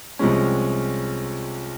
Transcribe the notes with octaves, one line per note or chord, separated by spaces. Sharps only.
C2 C3 F3 G#3 C#4